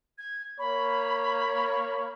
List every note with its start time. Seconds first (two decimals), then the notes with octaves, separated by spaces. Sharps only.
0.18 G#6
0.59 A#3 C#5 B5